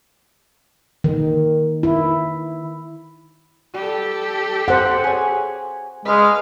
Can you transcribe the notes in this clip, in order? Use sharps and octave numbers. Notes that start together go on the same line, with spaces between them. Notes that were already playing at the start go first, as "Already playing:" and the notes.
D#3
E4
G3 G4 A4
C4 F#4 C5 F#5
G#4 C#5
G#3 B4 D#5 F5